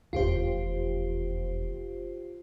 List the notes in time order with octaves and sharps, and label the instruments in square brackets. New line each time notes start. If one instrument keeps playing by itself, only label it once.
[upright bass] F1 E2 [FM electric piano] F4 G4 C5